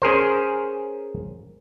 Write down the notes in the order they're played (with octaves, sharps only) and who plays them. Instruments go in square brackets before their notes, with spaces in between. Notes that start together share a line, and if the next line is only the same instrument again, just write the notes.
[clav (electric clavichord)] C#4 G#4 A#4 C5